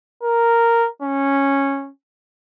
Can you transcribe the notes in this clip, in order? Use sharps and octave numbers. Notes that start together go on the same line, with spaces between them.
A#4
C#4